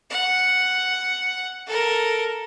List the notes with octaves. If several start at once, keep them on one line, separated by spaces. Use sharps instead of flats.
F#5
A4 A#4